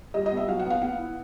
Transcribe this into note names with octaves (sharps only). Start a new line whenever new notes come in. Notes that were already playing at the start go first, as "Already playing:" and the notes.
G3 D#5
D#5
B3
E5
F#3 F5
F#5
B3 F5
B3 F#5
E4